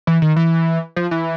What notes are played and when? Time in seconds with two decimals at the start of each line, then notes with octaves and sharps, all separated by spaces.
0.07 E3
0.22 D#3
0.36 E3
0.96 F3
1.11 E3